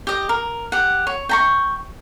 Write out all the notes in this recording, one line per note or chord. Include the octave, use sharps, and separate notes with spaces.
G4 D#5
A#4
G4 F#5
C#5
G5 A#5 C#6